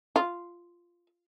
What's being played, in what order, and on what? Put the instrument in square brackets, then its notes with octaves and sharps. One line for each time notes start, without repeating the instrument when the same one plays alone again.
[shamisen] F4